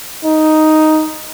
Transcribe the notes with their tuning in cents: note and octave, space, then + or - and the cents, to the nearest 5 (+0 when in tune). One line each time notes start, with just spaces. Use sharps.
D#4 +0